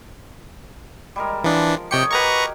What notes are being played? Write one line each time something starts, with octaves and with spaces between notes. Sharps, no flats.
G3 G#3 A#4
E3 F3 D4
C3 G4 C#5 D#5 G5 C#7
F#4 G4 A#4 B4 A#5 C#6